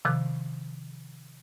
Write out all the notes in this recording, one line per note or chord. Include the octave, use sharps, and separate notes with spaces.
C3 D#3 F3 D6 F#6